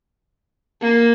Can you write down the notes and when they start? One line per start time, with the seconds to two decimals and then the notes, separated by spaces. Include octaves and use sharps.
0.82 A#3